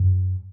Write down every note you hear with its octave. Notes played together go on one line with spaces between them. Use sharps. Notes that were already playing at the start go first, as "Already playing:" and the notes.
Already playing: F#2